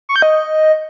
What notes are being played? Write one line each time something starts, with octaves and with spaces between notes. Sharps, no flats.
C#6
G6
D#5